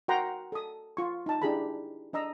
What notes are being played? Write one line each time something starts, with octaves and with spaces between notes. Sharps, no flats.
F#4 A#4 F#5 G5 A#5 C6
A4 D#6
F4 C#6
D#4 A5
D4 E4 G4 G#4 A#5 B5
D4 D#5 A#5 E6